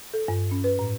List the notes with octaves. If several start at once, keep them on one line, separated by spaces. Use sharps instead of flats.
A4
G2
C#4
B4
A2